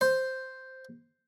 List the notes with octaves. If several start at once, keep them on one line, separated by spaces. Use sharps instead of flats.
C5